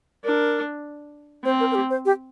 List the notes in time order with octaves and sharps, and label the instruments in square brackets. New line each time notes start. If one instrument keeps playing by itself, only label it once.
[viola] D4 [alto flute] A#4
[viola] C4 [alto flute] C5
[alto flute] A#4
A#4
G4
C5
G4